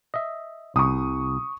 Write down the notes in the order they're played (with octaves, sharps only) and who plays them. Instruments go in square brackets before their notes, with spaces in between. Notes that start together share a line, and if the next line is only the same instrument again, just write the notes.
[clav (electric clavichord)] D#5 E5
[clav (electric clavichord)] C2 [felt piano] C#6 D#6